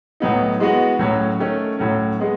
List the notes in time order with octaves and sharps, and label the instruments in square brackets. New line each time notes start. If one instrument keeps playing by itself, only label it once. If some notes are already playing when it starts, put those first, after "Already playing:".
[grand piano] A2 F#3 B3 D#4
E3 G#3 B3 F#4
A2 F#3 C#4
D#3 A3 C#4
A2 F#3 C#4
G#3 B3